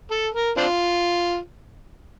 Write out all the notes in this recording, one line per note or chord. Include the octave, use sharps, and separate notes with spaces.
A4
A#4
C4 D4 F4